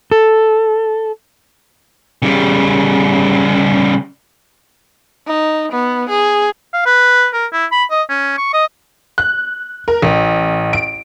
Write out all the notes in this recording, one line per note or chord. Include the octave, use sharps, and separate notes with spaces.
A4
C#3 G3
D#4
B3
G#4
F5
B4
A#4
E4
B5
D#5
C#4
C#6
D#5
F#6
A#4
A1
D7